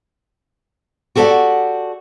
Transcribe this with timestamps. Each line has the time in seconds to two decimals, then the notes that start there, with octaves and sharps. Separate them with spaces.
1.15 F#4 G4 A4 A#4 D5 F#5